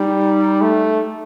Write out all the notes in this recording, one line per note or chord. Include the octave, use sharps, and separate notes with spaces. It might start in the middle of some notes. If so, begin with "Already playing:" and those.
Already playing: G3 D#4
A3